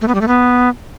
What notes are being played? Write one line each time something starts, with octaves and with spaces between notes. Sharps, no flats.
A3
B3
G3
A3
B3